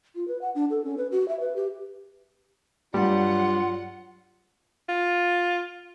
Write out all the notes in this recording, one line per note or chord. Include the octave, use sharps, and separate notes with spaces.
F4
B4
F#5
D4
A4
C#4
B4
F#4
E5
B4
G4
G2 F#3 G3 F4 F#5
F4